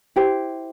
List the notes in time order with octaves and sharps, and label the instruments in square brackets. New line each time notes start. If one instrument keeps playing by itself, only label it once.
[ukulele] E4 G4 C5